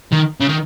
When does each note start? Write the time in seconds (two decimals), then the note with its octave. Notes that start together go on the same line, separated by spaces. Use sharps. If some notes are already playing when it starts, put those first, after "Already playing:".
0.12 D#3
0.40 C#3
0.49 D#3